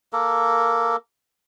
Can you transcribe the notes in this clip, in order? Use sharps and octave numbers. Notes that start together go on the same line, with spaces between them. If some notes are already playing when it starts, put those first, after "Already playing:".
A#3 A4 A#4